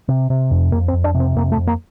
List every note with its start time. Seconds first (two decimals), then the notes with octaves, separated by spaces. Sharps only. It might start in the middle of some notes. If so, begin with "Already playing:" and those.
0.08 C3
0.30 C3
0.51 F2
0.72 F2 A#3
0.88 C4
0.93 F2
1.04 D4
1.15 C3
1.20 C4
1.36 F2 A#3
1.52 A3
1.57 F2
1.67 A#3